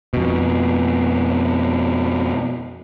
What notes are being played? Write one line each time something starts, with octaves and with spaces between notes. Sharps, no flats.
F2 B2